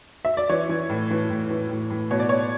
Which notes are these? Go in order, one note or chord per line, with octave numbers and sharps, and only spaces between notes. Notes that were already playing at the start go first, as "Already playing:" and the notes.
E5
D5
E3 C#5
E3
A2
E3
A2
E3
A2
A2
B2 C#5
D5
B2 C#5